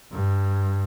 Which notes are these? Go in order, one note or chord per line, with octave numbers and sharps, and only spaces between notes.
G2